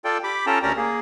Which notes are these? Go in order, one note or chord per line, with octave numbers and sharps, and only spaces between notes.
F4 A4 D5 G5
G4 B5 D6
C#4 F4 A4 G5 A5 A#5
D2 C#4 G4 A#4 D5 A#5
A#3 G#4